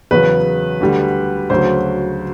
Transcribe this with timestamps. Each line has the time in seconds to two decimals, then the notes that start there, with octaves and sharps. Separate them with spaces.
0.11 E2 C#3 F#3 B4
0.80 D2 D3 G3
1.50 D2 C#3 F#3 C5